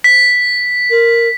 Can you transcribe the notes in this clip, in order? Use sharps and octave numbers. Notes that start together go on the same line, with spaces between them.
B6
A#4